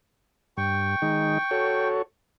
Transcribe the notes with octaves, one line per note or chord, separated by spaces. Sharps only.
G2 G5 C#6
D#3 G#3 D#4
F#4 A4 C#5